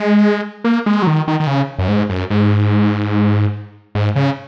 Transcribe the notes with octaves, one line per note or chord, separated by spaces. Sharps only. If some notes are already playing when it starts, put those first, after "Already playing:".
Already playing: G#3
A#3
G#3
F#3
D#3
D#3
D#3
C#3
F#2
G#2
F#2
G#2
G#2
C#3